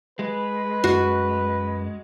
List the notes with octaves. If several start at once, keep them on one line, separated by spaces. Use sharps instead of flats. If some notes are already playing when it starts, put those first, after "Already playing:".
G#3 B4
F#2 F#4